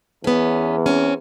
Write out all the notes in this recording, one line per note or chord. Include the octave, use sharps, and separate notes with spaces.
E2 B3 C#4
C4 C#4